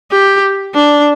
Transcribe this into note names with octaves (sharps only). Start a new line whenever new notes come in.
G4
D4